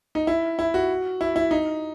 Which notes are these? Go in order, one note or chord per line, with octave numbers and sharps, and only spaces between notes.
D#4
E4
E4
F#4
E4
E4
D#4